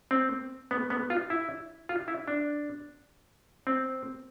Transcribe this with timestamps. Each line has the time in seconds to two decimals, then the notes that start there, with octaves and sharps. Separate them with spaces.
0.11 C4
0.71 B3
0.90 B3
1.10 F4
1.30 E4
1.89 F4
2.08 E4
2.28 D4
3.67 C4